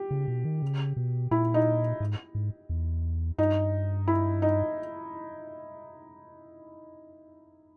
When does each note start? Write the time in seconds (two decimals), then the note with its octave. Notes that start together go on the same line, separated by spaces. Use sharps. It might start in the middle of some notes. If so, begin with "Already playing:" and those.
Already playing: G4
0.11 C#3
0.28 B2
0.45 D#3
0.62 C#3
0.97 B2
1.31 A#2 E4
1.54 D#4
2.00 G#2
2.35 G#2
2.69 E2
3.38 G2 D#4
4.08 E4
4.42 D#4